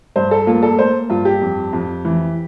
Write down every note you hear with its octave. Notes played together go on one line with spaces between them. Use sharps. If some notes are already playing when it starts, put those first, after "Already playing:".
G2 C5
A4
A#3 F4
A4
A#3 C5
G2 F4
G4
F2
F2
E3